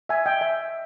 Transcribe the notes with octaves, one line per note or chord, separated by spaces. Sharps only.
E5 G#5
D#5 G5
E5 G#5